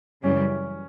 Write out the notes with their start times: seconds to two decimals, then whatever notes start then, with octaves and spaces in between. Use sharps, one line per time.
0.23 F#2 C#3 E3 G3 C#4